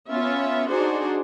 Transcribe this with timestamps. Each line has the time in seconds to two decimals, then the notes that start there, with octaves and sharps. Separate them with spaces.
0.10 B3 C#4 F4 E5
0.69 D4 D#4 F#4 G#4 C5